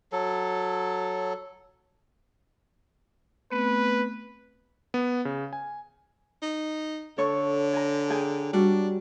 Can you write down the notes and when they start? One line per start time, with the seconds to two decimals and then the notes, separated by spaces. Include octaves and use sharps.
0.12 F#3 A4
3.51 A3 B3 C4 B4
4.94 B3
5.25 C#3
5.53 G#5
6.42 D#4
7.18 D3 A4 C#5 C#6
7.73 G#5 A#5
8.10 G#4 G5 G#5
8.53 G3 D4 F#4